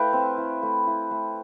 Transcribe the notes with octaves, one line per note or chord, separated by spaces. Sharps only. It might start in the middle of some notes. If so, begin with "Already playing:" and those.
Already playing: A3 E4 B4 F5 G5 A5
C4
E4
A3
E4
A3